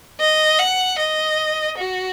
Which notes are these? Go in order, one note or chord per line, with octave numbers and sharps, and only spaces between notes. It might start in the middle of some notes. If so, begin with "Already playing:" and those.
D#5
F#5
D#5
F#4